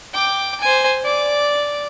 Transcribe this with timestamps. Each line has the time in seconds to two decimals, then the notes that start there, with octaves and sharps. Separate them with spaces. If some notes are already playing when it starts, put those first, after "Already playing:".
0.13 G5 D6
0.61 C5 G#5
1.03 D5 D6